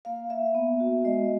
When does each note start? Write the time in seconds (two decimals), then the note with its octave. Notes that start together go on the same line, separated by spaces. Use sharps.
0.05 A#3 F5
0.30 A#3 E5
0.55 B3
0.80 F#4
1.05 G#3 D#5